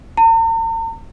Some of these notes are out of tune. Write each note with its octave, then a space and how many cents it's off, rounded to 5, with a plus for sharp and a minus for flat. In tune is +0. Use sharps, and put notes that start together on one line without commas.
A#5 -45